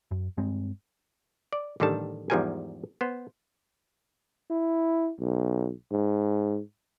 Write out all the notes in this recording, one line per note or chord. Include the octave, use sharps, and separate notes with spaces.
F#2
G2 G#3 C4
D5
A1 D3 D#3 G3 A4 A5
E2 G#2 F3 G3 A#4 G#5
B3 C5
E4
B1
G#2